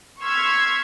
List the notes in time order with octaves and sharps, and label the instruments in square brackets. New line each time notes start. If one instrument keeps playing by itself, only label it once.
[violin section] C6 C#6 E6 F6 G#6 B6